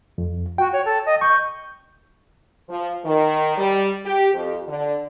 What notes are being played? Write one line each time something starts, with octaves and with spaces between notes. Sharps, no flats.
F2
F#4 G5
C#5
A4
D#5
C#6 G6
F3
D#3
G3
G4
F2
D3